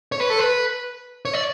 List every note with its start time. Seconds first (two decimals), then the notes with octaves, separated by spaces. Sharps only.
0.12 C#5
0.21 B4
0.30 A4
0.38 B4
1.25 C#5
1.33 D5